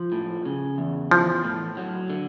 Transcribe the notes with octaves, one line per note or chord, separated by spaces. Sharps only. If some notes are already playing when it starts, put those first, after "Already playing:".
Already playing: F3
A2
C#3
E2
E3 F3
A2
F#3
D3